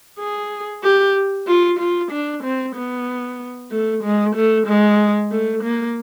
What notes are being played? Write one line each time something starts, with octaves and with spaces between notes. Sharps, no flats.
G#4
G4
F4
F4
D4
C4
B3
A3
G#3
A3
G#3
A3
A#3